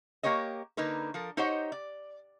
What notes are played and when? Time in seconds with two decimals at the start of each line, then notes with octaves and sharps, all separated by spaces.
0.23 A#3 G4 A#4 C#5 D#5
0.77 D3 A#3 D#4 A#4 B4
1.14 F3 A4 A#4
1.37 D#4 G4 C5 C#5 D#5 F#5
1.72 D5